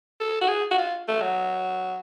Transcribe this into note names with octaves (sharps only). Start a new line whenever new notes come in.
A4
F#4
G#4
F#4
F4
A3
F#3